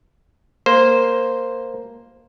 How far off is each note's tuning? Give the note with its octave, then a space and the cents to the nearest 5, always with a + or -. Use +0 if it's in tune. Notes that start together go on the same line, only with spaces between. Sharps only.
A#3 +0 C5 +0